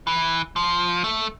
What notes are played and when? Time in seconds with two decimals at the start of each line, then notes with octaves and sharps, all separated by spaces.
0.07 E3
0.56 F3
1.04 A3